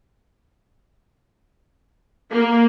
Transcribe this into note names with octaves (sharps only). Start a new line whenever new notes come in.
A#3